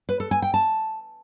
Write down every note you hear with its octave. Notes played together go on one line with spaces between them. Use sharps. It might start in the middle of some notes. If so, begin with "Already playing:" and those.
B4
A4
G#5
G5
A5